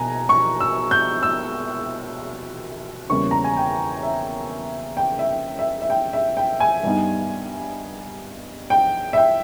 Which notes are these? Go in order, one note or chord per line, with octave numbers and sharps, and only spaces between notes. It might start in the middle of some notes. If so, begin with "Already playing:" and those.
Already playing: B2 A#3 G#5 A#5
C#6
E6
G6
E6
E2 C#3 G3 A#3 C#4 C#6
A#5
G#5
G5
E5
G5
E5
G5
E5
E5
G5
E5
G5
G#5
G2 G3 B3 D#4
G5
E5
G5